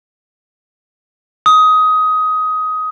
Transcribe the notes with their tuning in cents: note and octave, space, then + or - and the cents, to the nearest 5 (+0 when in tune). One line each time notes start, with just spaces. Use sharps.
D#6 +15